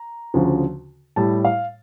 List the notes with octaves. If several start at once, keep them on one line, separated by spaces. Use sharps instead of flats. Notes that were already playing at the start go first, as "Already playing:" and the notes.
Already playing: A#5
D2 C#3 F3
A2 G3 A5
F5